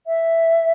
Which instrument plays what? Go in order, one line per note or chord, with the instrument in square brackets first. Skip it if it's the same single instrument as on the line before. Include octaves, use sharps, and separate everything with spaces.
[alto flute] E5